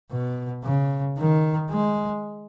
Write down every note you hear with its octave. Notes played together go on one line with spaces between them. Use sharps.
B2
C#3
D#3
G#3